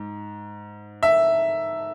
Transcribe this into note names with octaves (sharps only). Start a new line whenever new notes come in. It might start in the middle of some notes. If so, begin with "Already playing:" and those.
Already playing: G#2
E5